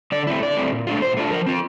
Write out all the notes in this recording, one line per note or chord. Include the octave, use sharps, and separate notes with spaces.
D3 D5
A3 C4 E4
D3 D5
A3 C4 E4
A#2
A3 D4 F4
A#2 C5
A3 D4 F4
F3 A#4
C4 F4